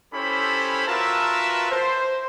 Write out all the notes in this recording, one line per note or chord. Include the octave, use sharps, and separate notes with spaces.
C#4 E4 G4 A4 C5 B5
F4 F#4 A#4 B4 E5 A5
C5